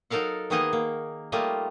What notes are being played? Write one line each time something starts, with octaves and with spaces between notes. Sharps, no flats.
F#3 D#4 A4 A#4 F5 F#5
D#3 A#3 B3 D#4 G#4 D#5
A#3
G3 A3 A#3 F4 D#5